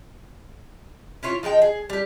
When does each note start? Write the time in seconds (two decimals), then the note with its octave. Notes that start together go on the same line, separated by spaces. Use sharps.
1.23 C#4 E4 F4 C#5
1.43 F3 G#3 D#4 G5
1.62 G#4
1.90 G3 G4